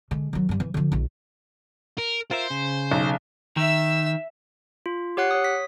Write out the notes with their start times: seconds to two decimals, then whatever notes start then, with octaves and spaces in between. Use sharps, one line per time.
0.11 D3 G#3
0.33 D#3 F#3
0.49 G2 G3
0.60 E3
0.74 D3 F3
0.92 A#1 D#4
1.98 A#4
2.31 F4 A#4 C5 E5
2.50 C#3
2.91 B1
3.57 D#3 E5 E6
4.86 F4
5.17 G4 C#5 F#5 F#6 C7
5.31 C#5 D#6
5.44 B6